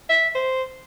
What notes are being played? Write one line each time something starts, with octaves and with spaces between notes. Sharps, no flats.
E5
C5